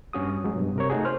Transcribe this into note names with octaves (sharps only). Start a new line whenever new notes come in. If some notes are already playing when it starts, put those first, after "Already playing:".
G2 C#4 F#4 D#6
F#3 G#3
G2 B2
C3 A#4 C#5
A3 D#4 F#4 G#4
C5 C6 F6